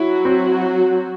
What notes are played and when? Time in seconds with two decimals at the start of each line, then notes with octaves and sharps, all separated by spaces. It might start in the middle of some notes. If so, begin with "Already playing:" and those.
Already playing: F#3 E4 F#4
0.25 C4